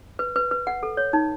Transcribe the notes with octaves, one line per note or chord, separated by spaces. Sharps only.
B4
B4
B4
F#5
A4
C#5
D#4